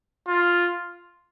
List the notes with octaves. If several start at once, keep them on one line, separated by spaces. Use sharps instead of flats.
F4